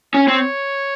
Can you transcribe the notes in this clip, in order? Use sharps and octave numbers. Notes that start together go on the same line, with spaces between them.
C#4 C#5
C4